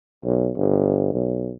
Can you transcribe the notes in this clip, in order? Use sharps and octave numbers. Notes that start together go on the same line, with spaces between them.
B1
G1
B1